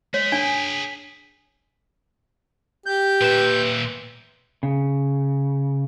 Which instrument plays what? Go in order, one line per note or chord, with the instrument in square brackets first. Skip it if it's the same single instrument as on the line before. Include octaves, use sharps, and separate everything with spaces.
[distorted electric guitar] G#3 [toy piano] C#5 [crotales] B6
[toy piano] D4 [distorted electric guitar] G#4 G5 [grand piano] G#5
[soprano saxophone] G4 [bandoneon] G6
[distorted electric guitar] A#2 E5 [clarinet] B4
[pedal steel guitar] C#3